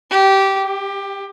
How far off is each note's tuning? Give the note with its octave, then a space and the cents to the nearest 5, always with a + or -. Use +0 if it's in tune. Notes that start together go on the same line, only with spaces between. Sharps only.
G4 -15
G4 +20